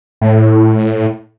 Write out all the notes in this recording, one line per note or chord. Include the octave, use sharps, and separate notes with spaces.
A2